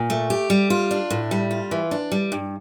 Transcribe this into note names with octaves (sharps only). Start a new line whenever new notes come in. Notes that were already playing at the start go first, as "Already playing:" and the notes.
Already playing: A#2
A3
G4
G3
F4
D4
A2
G3
F4
E3
D4
G3
G2